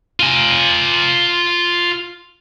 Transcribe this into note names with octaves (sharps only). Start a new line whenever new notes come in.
F4 G#5